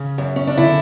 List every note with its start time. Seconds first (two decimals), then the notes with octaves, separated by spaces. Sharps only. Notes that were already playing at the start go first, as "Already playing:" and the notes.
Already playing: C#3
0.18 F#2
0.36 C#4
0.47 D4
0.57 D3 E4